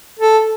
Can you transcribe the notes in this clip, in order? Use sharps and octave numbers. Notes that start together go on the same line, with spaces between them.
A4